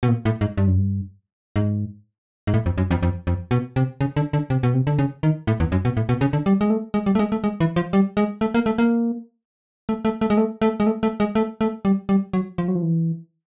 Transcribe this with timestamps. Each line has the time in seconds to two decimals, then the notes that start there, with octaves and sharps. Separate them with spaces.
0.03 B2
0.08 A#2
0.25 A2
0.41 G#2
0.57 G2
0.67 F#2
0.77 G2
1.56 G#2
2.47 G#2
2.54 A2
2.66 F2
2.78 F#2
2.91 F2
3.03 F2
3.27 F2
3.51 B2
3.76 C3
4.01 C#3
4.16 D3
4.33 D3
4.50 C3
4.63 B2
4.74 C3
4.87 D3
4.99 C#3
5.23 D#3
5.47 A2
5.60 E2
5.72 F#2
5.85 B2
5.97 A2
6.09 B2
6.21 C#3
6.33 D3
6.46 G3
6.61 G#3
6.70 A3
6.94 G#3
7.06 G3
7.15 A3
7.19 G#3
7.32 A3
7.44 G#3
7.60 E3
7.76 F3
7.93 G3
8.17 G#3
8.41 A3
8.54 A#3
8.66 A3
8.78 A#3
9.89 A3
10.05 A3
10.21 A3
10.30 G#3
10.37 A3
10.62 A3
10.80 G#3
10.87 A3
11.03 A3
11.20 G#3
11.35 A3
11.61 A3
11.85 G3
12.09 G3
12.33 F#3
12.58 F3
12.68 F#3
12.75 F3
12.82 E3